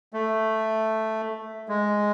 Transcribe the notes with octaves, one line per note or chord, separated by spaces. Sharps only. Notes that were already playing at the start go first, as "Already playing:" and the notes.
A3
G#3